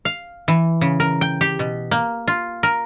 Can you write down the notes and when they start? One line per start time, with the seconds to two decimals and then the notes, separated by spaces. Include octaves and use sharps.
0.05 F5
0.48 E3
0.81 C#3
1.00 A#4
1.21 G5
1.41 G4
1.59 B2
1.91 A#3
2.28 F4
2.63 A#4